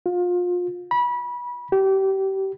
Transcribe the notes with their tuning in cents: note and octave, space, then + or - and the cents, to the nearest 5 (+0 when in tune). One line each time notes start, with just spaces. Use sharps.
F4 +30
B5 -25
G4 -25